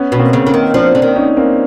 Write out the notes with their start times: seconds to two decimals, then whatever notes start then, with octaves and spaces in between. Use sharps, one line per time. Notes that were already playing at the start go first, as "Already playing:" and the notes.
Already playing: B3 C#4
0.12 B2 C#4
0.19 A#3 C4
0.33 C#3
0.46 D3 A#3 C4
0.54 D#3
0.74 F3 C4 D4
0.95 D3 C4 D4
1.02 D#3
1.16 C#4 D#4
1.37 A#3 C4